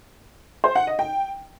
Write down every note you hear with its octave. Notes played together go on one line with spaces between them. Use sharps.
C5
F#5
D#5
G5